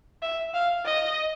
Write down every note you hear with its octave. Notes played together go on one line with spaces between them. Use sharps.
E5
F5
D#5